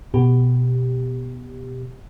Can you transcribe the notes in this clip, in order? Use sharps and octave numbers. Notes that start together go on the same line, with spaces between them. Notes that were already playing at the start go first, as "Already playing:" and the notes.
B2 G4